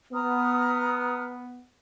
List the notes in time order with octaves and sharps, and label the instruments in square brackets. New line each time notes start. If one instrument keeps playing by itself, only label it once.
[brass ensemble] B3 [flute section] A#5 D#6 F6